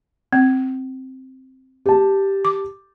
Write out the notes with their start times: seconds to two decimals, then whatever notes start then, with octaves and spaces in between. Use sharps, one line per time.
0.33 C4
1.86 G4 A5
2.45 D6